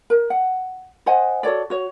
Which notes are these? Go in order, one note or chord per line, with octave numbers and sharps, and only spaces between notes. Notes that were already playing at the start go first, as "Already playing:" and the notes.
A#4
F#5
C5 D#5 F#5 G#5
F#4 A4 C#5 D5
F#4 C#5